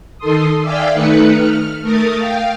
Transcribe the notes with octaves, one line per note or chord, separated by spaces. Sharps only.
D#3 A4 C6 D#6
D5 E5 F5 G5 G#5
D#3 A3 D#4 B4 F#6 C#7
F6
A3 A#4 D#6 A6
F5 G5